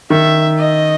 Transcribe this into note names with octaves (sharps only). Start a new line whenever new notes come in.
D#3 E5
D#5